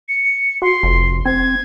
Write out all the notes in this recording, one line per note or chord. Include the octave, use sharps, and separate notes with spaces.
C#7
F#4 C6
F1
C4 G#6